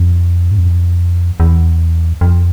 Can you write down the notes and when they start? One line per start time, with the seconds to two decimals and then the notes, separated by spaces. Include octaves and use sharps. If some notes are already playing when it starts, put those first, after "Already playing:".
Already playing: F2
0.51 G#2
0.58 F2
1.40 E2
2.21 F2